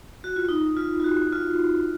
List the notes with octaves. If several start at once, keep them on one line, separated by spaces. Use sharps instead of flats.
F#4
F4
D#4
F4
F4
F#4
F4